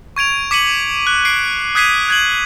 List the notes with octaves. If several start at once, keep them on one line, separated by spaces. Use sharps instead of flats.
C#6 G#6 D7 F7
D6 B6 C#7 D#7 F#7
F#6
C7 D7
D#6 F#6 G#6 B6 C7 D#7
F#6 G#6 F#7